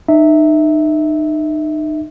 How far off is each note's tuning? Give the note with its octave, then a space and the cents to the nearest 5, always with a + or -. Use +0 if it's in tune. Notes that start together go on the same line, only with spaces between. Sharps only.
D#4 -30 E5 -15